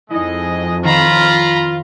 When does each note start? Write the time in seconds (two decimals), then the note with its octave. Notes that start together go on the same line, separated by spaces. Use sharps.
0.11 F2 G#3 D#4 E4 G#4 D#5
0.84 D#3 F4 A#5 B5 C7 E7